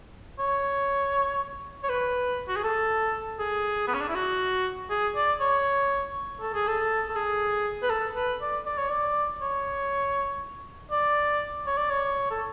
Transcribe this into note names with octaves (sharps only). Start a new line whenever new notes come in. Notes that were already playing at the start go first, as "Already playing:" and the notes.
C#5
C#5
B4
F#4
G#4
A4
G#4
B3
C#4
D4
E4
F#4
G#4
D5
C#5
A4
G#4
A4
A4
G#4
B4
A4
B4
D5
D5
C#5
D5
C#5
D5
C#5
D5
C#5
A4